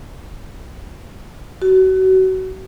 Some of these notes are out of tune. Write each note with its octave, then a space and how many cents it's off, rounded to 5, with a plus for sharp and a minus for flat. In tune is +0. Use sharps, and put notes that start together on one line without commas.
F#4 +30